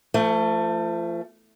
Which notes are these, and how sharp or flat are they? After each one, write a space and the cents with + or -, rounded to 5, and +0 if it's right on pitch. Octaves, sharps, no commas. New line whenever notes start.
F3 -30 A3 +20